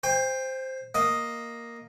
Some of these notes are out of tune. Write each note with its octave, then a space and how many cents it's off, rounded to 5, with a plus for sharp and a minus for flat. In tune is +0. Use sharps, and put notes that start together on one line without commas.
C5 +0 G5 +35
A#3 +0 D#5 +0